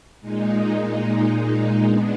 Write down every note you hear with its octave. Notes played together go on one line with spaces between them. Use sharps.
A#2 G#3 D#4
G#3 B3 D4